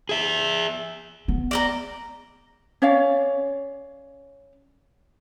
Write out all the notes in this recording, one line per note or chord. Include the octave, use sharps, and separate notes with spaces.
G#4 E5
B3
D5 D#5 A#5
C#4 C#5 D5 F5